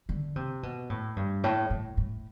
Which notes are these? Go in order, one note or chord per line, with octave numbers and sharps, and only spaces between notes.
D3
C3
B2
A2
G2
A2
A2
A2